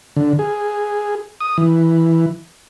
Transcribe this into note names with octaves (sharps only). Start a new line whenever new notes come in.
D3
G#4
D#6
E3